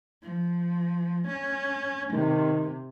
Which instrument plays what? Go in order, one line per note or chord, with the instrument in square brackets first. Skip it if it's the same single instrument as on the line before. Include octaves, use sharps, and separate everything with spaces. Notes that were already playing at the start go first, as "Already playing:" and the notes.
[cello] F3
C#4
[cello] C3 [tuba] D#3